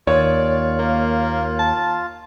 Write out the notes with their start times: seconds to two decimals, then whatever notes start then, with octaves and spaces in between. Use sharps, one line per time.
0.07 D#2 F4 C#5 D5
0.79 A#3
1.60 A5